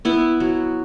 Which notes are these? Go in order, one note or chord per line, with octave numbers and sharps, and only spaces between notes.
B3 E4
F#3